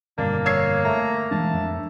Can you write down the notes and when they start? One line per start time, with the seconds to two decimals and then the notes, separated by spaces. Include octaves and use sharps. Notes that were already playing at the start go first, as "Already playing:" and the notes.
0.18 G1 F2 B2 A#3 D4
0.46 C#5 E6 G#6 C7
0.85 A3 E5 A#5
1.31 E3 G#3 D4 A5
1.53 F2 D4